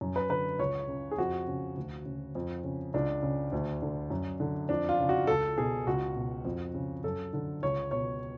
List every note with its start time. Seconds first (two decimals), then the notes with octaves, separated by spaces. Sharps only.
0.01 F#2
0.16 B4
0.29 D3 B4
0.59 C#2 C#5
0.88 C#3
1.11 G#4
1.18 F2 F#4
1.48 C#3
1.77 D2
2.05 C#3
2.35 F2
2.64 C#3
2.94 C#2 D4
3.22 C#3
3.52 D2
3.82 D3
4.10 F#2
4.40 D3
4.69 F2 D4
4.89 F4
4.99 C#3
5.09 F#4
5.27 C#2 A4
5.58 B2 G#4
5.87 C#2 F#4
6.16 B2
6.45 F2
6.74 C#3
7.04 F#2 A4
7.33 D3
7.63 C#2 C#5
7.91 B2 C#5